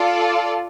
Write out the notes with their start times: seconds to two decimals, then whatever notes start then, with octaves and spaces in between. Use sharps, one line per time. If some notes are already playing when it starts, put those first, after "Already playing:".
Already playing: F4 A4 D5